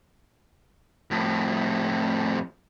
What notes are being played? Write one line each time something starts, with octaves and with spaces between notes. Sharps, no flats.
F2 A2